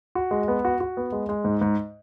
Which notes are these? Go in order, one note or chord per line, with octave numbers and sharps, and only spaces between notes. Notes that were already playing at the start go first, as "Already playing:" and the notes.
F#4
G#3
B3
F#4
F#4
B3
G#3
G#3
G#2
G#2